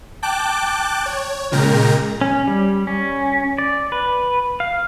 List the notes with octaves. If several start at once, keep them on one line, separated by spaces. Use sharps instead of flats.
G5 A5 D6 F#6
C#5
A#2 C#3 G#3 A#4 G5 A#5
C#4
G3
C#4
D5
B4
F5